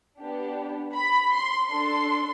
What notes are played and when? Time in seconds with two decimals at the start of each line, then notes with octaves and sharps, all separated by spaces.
0.19 B3 D4 G4
0.95 B5
1.33 C6
1.69 D4 A4 C6